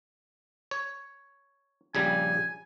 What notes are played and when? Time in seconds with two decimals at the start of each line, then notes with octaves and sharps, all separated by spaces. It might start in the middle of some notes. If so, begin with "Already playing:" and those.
0.71 C#5
1.95 A#1 C#3 G3 G#5